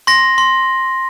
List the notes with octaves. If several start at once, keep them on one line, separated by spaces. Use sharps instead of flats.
C6 A#6
C6